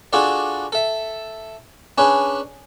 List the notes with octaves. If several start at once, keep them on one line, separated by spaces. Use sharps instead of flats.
D4 F4 F#4 G#4 A4 D5
A4 E5
C#4 D4 G#4 B4